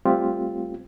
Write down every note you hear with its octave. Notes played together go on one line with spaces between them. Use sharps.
G3 A3 C4 F4 G4